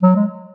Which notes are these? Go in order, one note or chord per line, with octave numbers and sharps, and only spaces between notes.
F#3
G#3